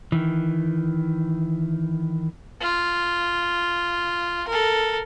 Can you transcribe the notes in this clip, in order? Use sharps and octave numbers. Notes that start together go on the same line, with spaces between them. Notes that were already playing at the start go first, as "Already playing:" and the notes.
D#3 E3
F4
A4 A#4